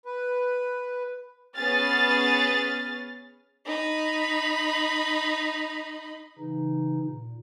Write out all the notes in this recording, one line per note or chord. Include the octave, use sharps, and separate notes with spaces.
B4
B3 C#4 G#4 F6 A6
D#4 B5
C#3 E3 D#4
A#2